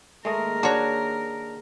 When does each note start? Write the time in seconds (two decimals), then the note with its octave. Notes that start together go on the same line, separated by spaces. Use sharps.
0.25 D#2 G#3 A3 G#4 A#4 D#5
0.63 D4 F#4 C#5